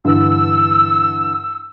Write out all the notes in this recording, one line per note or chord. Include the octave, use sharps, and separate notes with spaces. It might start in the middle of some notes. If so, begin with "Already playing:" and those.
G2 D3 E3 E6